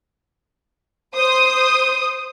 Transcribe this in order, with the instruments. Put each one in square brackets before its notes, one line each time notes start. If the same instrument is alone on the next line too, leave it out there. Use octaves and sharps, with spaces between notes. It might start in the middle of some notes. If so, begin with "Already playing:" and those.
[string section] C5 D#6